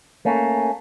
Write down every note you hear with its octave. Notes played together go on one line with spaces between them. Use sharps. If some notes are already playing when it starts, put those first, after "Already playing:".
A3 A#3 C#4